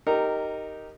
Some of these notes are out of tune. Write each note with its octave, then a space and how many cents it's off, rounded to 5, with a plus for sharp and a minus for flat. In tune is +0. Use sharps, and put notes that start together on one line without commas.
D#4 +0 G4 -10 A#4 -15